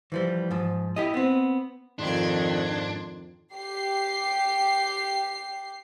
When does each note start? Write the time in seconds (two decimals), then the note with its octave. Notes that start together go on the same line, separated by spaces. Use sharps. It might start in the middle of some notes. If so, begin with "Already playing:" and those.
0.12 E3 F3 G3
0.51 G#2 F3
0.96 E4 G4 D#5
1.14 B3 C4
1.99 F2 G#2 D#3 D4 C6 G#6
3.55 G4 C7